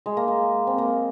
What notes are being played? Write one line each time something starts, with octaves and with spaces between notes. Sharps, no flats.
G#3
A#3
G#3
C4
A#3